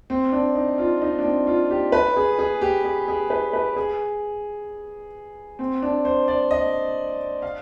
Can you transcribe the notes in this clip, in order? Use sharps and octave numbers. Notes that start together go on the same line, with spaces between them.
C4
D4
D#4
F4
D#4
D4
C4
F4
G4
B4
G#4
G#4
G4
G#4
G#4
B4
B4
G#4
C4
D4
C5
D5
D#5
F5